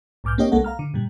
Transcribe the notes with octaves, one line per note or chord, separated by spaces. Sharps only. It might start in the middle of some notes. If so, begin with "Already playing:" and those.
B1 G#2 D6 F6 G6
A#3 C4 D4 G4 C#5 D#5
C2 G#3 A#3 A4 F#5
F5 A#5 F6
D3
G2 A#2 G3